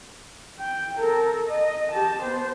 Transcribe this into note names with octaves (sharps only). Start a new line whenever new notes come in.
G5
A4 A#4
D#5
G4 A5
B3 C5